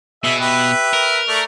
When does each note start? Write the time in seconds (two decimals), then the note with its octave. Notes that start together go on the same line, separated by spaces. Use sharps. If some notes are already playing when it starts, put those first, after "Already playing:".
0.24 B2 G#4 E5
0.40 G4 B4 E5
0.93 A#4
1.28 A3 D5 C#6